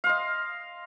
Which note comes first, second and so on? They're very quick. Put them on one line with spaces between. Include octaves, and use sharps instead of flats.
F5 C6 D#5